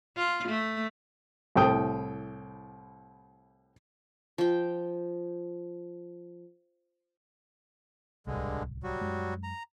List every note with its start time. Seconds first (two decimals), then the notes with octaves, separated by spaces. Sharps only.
0.17 F4
0.48 A3
1.56 C2 A2 G5 D#6
4.38 F3 G5
8.27 D1 C2 G2 D3 G#3
8.84 F#3 G3 F#4
9.01 F#2 G#3
9.43 A#5